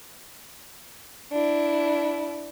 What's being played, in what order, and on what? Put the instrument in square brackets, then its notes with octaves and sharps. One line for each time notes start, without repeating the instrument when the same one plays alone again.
[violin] D4 E4